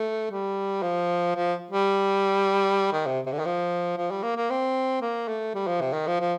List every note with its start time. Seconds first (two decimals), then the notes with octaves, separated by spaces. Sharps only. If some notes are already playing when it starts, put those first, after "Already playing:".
Already playing: A3
0.31 G3
0.82 F3
1.36 F3
1.71 G3
2.93 D#3
3.06 C3
3.26 C3
3.32 D3
3.39 D#3
3.45 F3
3.97 F3
4.11 G3
4.23 A#3
4.36 A#3
4.50 C4
5.01 A#3
5.28 A3
5.54 G3
5.67 F3
5.81 C3
5.93 D#3
6.07 F3
6.20 F3